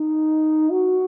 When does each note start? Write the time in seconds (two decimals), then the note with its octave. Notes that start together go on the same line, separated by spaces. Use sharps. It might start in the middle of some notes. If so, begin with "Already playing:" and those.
Already playing: D#4
0.70 F#4